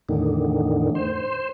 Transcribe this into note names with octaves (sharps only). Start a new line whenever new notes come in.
E2 A2 D3 D#3
C5